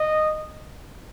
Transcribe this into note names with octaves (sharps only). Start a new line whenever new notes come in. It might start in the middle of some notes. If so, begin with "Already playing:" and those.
Already playing: D#5